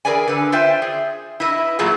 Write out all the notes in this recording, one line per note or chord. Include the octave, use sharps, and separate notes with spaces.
G#4 A#4 B4 D5 G#5
D3 B4
F4 C5 E5 G5
G#4
E4 B4 D#5
A#2 F#3 A3 A#3 F4 G#4